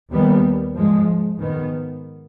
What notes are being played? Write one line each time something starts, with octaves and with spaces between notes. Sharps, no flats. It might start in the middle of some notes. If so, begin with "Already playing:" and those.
D#2 D#3 G3 B3
G#2 F3 G#3
G#2 D#3 B3